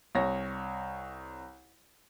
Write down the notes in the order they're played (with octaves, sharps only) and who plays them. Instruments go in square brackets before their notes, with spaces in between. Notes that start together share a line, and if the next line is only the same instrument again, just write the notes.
[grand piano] C2 C#5 A#6